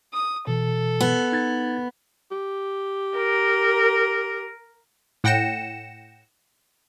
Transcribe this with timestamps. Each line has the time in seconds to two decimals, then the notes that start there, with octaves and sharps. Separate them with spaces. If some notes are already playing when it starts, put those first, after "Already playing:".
0.13 D#6
0.47 B2 E3 A4
1.01 B3
1.32 D#4 G#6 A6
2.32 G4
3.15 A#4
5.24 A2 F#5 G5 A#6 C#7 E7